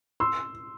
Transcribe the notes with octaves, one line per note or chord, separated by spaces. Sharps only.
C6 E6